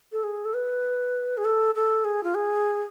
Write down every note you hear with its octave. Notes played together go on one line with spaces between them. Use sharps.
A4
G#4
A4
B4
G#4
A4
A4
G#4
F4
G#4